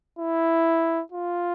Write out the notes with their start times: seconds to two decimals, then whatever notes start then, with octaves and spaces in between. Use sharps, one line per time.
0.19 E4
1.12 F4